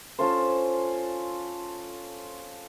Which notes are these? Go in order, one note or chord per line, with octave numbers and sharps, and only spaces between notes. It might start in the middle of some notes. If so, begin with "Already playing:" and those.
C#4 F4 A4 C5